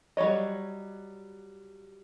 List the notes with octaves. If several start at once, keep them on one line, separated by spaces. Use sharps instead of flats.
F#3 G3 C#5 D#5